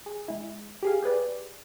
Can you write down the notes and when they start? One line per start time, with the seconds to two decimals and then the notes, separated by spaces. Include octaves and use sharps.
0.06 G#4
0.28 G#3 E4
0.83 G4 G#4 F5
1.02 G4 G#4 B4 D5